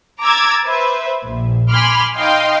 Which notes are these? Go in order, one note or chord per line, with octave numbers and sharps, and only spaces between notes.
A#5 D6 E6 G#6 A6
B4 C5 E5
A#1
G#5 B5 C6 D6 F6
D#4 D#5 F5 G5 C6